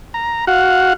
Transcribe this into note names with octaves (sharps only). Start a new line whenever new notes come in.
A#5
F#4 F5 F#5